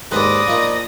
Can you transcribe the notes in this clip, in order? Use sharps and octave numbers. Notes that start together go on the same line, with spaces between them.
D#2 G#2 B4 C5 D5 D#6 A#6
A#2 F3 D#4